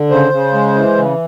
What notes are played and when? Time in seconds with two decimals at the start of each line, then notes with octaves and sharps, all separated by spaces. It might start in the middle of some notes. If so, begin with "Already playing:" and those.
Already playing: D3
0.10 C#3 C5
0.32 C#3
0.53 G#3
0.74 E3
0.97 C#3